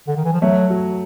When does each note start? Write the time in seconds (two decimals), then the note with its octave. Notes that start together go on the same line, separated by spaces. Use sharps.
0.08 D3
0.17 D#3
0.25 E3
0.33 F3
0.41 F#3 A3
0.70 F#3